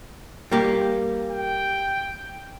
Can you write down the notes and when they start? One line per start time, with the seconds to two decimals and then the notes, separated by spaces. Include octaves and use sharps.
0.52 G3 A#3 G4
1.30 G5